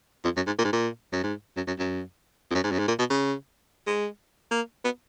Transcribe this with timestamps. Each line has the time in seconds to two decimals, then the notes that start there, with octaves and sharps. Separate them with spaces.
0.24 F2
0.37 F#2
0.47 G#2
0.58 A#2
0.64 G#2
0.73 A#2
1.13 F#2
1.23 G#2
1.56 F#2
1.67 F#2
1.79 F#2
2.50 F2
2.55 F#2
2.64 G#2
2.72 F#2
2.79 G#2
2.88 A#2
2.99 B2
3.10 C#3
3.87 G#3
4.51 A#3
4.84 B3